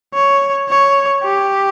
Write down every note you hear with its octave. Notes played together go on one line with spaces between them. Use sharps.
C#5
C#5
G4